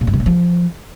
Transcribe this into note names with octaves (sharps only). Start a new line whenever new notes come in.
A#2
G2
B2
A#2
F3